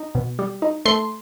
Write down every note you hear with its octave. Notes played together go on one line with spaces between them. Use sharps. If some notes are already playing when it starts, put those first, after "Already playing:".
Already playing: D#4
B2
G3
D#4
A3 C6